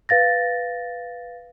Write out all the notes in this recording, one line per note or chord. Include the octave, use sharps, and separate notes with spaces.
B4 F5 A6 A#6